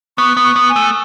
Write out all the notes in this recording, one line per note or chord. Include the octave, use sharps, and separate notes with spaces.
B3 C#6
B3
C#6
B3
G#5
A3